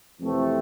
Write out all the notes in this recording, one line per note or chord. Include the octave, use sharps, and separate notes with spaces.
F2 C3 E3 A3 C4